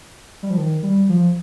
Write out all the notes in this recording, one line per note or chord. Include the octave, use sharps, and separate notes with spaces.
G3
F3
D#3
G3
F3